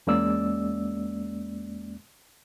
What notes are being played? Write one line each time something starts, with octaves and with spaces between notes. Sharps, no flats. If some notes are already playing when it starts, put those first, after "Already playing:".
E2 G#3 A#3 C#4 D5 E6